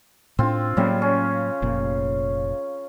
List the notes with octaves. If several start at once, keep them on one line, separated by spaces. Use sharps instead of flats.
A2 C4 D4 F4
A2 C#3 F#3 G3 A#3
C#4
F1 A#2